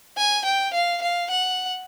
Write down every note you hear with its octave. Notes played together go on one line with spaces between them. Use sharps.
G#5
G5
F5
F5
F#5